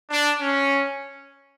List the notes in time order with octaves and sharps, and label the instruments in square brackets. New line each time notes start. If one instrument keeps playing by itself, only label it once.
[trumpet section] D4
C#4